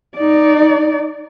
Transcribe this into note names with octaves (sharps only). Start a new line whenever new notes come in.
D#4 D5